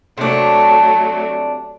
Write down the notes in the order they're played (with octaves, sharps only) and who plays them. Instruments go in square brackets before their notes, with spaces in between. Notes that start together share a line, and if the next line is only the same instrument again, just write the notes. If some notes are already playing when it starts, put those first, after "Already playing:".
[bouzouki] C3 D4 [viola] F#3 A3